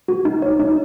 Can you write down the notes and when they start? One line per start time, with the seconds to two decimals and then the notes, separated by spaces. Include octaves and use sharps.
0.08 F#4
0.25 D#4
0.42 C#5
0.60 D#4